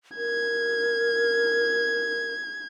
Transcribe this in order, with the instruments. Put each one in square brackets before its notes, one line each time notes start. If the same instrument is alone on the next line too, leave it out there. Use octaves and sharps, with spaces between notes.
[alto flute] A#4 [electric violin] G#6